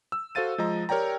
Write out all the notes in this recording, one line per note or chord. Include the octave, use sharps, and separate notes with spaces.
E6
F#4 A4 C5 F5 A6 D#7
F3 G#3 D#5 A#5
G4 A#4 C#5 D5 G5 A#5